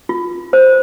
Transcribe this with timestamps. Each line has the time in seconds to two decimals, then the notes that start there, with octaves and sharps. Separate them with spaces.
0.09 F4
0.53 C5